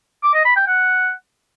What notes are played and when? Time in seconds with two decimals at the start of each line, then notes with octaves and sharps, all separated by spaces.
0.23 D6
0.34 D#5
0.45 B5
0.56 G5
0.67 F#5